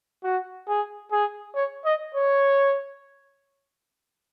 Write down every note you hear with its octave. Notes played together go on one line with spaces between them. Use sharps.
F#4
G#4
G#4
C#5
D#5
C#5